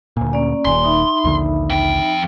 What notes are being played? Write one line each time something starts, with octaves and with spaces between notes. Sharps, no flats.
D2 A#2 G#5
A#3 C#4 D5
D#1 D#2 A#3 D5 G#5 C6
D#4 E5 B5
A#1 D#2 D3
F2 G5